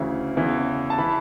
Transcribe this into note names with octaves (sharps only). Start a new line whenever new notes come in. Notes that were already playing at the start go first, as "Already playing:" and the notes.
Already playing: D2 C#3 E3
E2 C#3 E3
A5
E3 B5